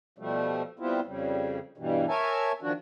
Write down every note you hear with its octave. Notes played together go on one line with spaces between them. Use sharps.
B2 F3 G3 A3
G3 B3 C4 E4 F4
F2 C#3 G3
G2 B2 E3 G3
A#4 C#5 E5 G#5 A5
D#3 F3 D4 F#4